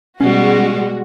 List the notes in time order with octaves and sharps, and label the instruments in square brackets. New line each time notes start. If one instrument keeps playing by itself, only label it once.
[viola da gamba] B2 G3 [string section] G#3 F#4 [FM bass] C#4